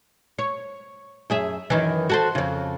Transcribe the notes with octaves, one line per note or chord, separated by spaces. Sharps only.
C#5
F#2 G#4 E5
F#2 D#3 E3
F#4 A4 C5
F2 C#3